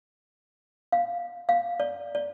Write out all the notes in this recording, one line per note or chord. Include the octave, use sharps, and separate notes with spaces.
F5
F5
D5
D5